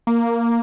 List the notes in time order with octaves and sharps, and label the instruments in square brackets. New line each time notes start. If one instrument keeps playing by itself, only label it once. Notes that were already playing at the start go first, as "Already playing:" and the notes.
[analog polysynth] A#3